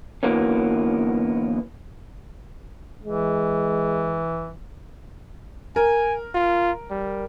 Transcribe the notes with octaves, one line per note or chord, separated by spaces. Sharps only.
D3 E3 F#3 A#3 B3 C#4
E3 G#3
A#4 G#5
F4
G3